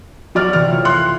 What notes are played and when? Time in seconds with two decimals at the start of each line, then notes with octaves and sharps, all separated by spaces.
0.35 F#3 D5 F6
0.53 C3 E3 F6
0.69 A3 F4 C#5
0.85 C6 F#6